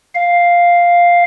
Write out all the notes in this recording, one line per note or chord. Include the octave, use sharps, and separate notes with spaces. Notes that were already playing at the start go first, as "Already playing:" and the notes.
F5